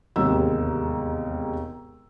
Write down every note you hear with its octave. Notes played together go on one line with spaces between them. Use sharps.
E1 D#2 G#2 C3 G4 E6